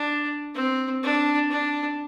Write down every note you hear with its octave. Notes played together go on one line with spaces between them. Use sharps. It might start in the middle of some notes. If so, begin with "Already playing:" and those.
Already playing: D4
C4
D4
D4